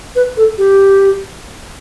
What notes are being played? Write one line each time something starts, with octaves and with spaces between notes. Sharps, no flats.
B4
A4
G4